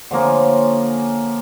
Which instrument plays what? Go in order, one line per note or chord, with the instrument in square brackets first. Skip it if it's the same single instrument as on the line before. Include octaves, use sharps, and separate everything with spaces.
[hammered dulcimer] D3 F3 A#3 C#4